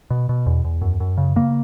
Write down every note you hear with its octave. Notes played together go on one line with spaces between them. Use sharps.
B2
B2
E2
E2
F#2
F#2
C#3
C#3 A#3